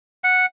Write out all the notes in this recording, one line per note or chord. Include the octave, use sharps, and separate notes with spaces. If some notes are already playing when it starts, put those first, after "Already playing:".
F#5